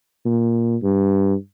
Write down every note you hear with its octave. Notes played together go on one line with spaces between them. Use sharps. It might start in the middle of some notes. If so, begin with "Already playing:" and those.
A#2
G2